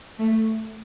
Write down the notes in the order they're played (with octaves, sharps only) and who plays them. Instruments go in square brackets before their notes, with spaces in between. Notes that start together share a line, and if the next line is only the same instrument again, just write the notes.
[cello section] A3